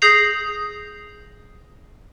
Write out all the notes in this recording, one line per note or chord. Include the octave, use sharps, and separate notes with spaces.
G#4 D#6 G6 A#6 C7 F7